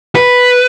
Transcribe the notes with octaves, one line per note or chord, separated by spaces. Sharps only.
B4